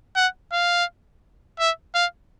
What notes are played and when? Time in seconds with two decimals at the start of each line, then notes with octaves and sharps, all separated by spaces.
0.16 F#5
0.52 F5
1.60 E5
1.95 F5